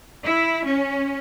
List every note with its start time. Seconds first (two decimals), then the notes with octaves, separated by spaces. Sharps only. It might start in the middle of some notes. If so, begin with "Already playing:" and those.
0.23 E4
0.65 C#4